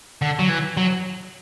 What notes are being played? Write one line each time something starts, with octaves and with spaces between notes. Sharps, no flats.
D3
F#3
E3
F#3